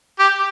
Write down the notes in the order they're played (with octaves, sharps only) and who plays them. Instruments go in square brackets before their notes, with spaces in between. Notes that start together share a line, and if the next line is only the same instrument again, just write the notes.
[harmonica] G4